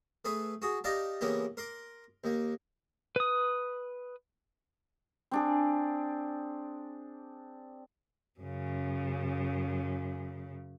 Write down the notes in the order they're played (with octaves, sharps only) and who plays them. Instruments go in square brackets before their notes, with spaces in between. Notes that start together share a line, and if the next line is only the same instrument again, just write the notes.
[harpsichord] A3 G#4 B4
F#4 G#4
D#4 G4 D5 F5 A5 A#5
C#3 E3 A#3 B3 G4
A#4 C6 D6
D#2 A#3
[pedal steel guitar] B4 D#6
[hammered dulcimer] C4 D4 G#4
[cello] F#2 C#3